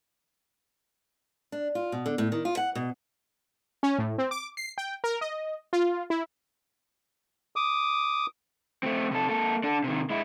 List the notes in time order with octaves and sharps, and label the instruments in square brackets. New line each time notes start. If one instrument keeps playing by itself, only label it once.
[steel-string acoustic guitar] D4
F4
B2
D3
A2
D#3
F4
F#5
B2
[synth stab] C#4
A2
C4
D6
C7
G5
A#4
D#5
F4
E4
[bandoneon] D6 D#6
[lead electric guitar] A3 C4
C3 A4
A#3 A4
D4 A4
C3 D#3
G#3 E4